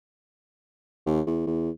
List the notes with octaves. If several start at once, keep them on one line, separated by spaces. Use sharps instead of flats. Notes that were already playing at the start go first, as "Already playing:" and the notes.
D#2
E2
E2